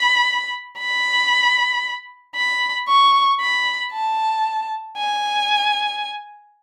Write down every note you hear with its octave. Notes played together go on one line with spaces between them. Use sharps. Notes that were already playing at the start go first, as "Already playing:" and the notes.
Already playing: B5
B5
B5
C#6
B5
A5
G#5